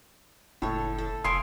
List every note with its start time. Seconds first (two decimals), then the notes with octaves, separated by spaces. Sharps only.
0.62 F#1 A2 A4 C#5
0.98 A4
1.24 F1 E4 F5 G#5 C6 D#6